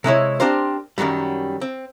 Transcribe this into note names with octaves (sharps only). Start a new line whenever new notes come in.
C3 G#3 E4 C#5
C4 D4 G4 A#4 C5
F#2 A2 D#3 F#3 G3
C4